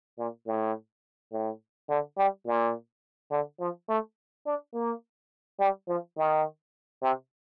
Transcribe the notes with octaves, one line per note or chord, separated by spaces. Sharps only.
A#2
A2
A2
D3
G3
A#2
D3
F3
A3
D4
A#3
G3
F3
D#3
C3